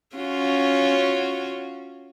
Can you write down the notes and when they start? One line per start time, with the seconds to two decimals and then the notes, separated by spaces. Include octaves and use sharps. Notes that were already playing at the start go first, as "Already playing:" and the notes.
0.16 C#4 F4 F#4